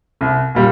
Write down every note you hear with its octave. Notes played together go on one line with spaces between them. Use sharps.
C2
A#2 G3